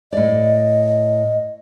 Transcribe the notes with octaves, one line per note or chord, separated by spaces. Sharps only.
A2 D5 D#5